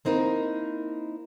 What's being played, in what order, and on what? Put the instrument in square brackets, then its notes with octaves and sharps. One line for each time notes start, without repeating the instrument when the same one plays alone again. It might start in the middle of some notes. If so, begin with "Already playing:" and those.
[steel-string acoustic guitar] A#3 C4 D#4 E4 A#4